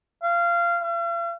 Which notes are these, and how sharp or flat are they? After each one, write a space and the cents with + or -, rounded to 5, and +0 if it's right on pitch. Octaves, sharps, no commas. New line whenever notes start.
F5 -20
F5 -45